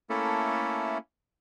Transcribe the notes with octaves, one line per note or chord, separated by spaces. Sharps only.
A3 A#3 C#4 E4 A4